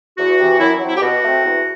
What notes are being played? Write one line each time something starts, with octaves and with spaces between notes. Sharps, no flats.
E2 F#4
C3 E3
F#2 E4
F#3 C4
E4
G4
B2 F#4
A3 C4
E2